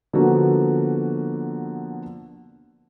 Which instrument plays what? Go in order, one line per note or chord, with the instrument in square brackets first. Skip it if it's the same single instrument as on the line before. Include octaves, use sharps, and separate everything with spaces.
[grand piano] D3 F3 A#3 B3 F#4